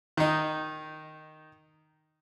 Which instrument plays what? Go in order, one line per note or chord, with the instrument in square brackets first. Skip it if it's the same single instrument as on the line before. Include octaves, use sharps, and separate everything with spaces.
[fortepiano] D#3 D#4